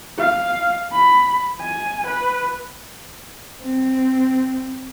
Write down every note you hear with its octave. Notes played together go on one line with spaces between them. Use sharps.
F5
B5
G#5
B4
C4